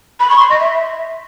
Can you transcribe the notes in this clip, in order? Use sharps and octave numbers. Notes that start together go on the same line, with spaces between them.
B5
C#6
C6
D#5
E5